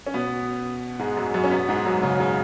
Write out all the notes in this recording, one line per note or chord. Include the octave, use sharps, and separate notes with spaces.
C#4
B2 B3
G#2 G#3
F#2 F#3
F#2 F#3
C#4
B2 B3
G#2 G#3
F#2 F#3
C#3
C#3